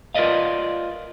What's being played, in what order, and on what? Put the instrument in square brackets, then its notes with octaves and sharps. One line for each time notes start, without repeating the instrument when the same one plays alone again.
[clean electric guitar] F4 A#4 B4 D5 D#5 F5